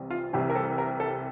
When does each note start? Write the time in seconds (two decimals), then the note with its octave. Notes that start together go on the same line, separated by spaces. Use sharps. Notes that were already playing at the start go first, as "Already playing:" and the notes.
Already playing: C2 C3 E3
0.10 F4
0.33 C2 C3 E3 G4
0.50 A#4
0.55 A4
0.78 A#4
1.00 A4